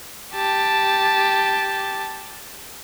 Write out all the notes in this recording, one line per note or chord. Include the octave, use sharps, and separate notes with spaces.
G4 A5